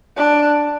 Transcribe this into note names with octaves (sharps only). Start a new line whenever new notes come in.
D4